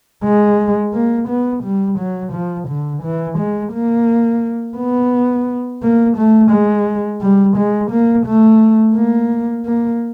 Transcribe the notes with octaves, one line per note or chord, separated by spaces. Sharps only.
G#3
A#3
B3
G3
F#3
F3
D3
E3
G#3
A#3
B3
A#3
A3
G#3
G3
G#3
A#3
A3
A#3
A#3